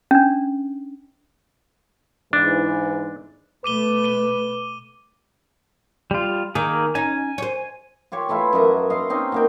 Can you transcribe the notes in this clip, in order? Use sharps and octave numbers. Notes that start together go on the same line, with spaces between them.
C#4 D4
G#2 E3 D4
B2 A3 B4 D6 D#7 G7
D#7 G7
G3 F4
D#3 A#3 G#4
C#4 D#4 G#5
C5 C#5
F4 G4 C#5
E3 A3 E4 F4
F#2 D#5 E5 A#5
D#5 F5 C6
C4 C#4 D#4
B2 A#3 G5